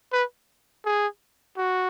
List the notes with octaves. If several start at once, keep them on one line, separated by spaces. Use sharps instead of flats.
B4
G#4
F#4